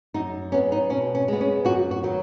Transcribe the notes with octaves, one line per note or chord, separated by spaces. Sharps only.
F#2 D#4
F#3 B3 C#4
D#4
B2 C#4
C#4
G#3 B3
C#4
F#2 F#4
F#4
D#3 F#3 B3